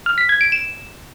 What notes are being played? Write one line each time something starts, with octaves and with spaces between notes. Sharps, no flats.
F6
B6
G#6
D7
E7